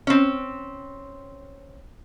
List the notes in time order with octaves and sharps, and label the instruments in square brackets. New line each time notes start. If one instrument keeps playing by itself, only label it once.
[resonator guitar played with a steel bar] C4 C#4